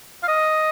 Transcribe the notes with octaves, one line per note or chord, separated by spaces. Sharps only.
F5
D#5